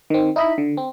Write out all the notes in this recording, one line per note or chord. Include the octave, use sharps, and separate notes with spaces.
D#3 C4
D#4 E4 D#5 E5 B5
D3
C4